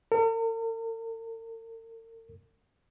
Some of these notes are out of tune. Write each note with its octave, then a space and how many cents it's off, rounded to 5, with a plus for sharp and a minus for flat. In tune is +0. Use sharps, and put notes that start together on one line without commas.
A#4 -45